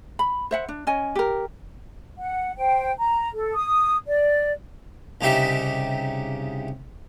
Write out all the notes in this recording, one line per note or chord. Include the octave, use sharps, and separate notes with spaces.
B5
C5 E5 F#5
D4
C#4 D#5 G#5
G4 A#4
F#5
C5 G5
A#5
A4
D#6
D5
C2 C#3 D#4 G4 E5